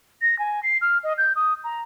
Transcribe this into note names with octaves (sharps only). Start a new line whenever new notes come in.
A#6
G#5
C7
F6
D#5
G6
D#6
A#5